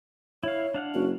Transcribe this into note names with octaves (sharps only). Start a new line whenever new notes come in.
E4 C#5 F5
D4 F5 F#5
F#1 F#4